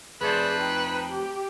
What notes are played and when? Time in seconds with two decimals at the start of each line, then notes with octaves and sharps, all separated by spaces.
0.21 F2 A3 G#4 B4 C5 D5
0.59 D#4 G5
1.10 G4